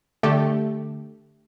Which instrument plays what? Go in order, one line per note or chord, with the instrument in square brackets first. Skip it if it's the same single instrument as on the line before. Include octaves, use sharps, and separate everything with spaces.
[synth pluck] D3 A3 G4 A4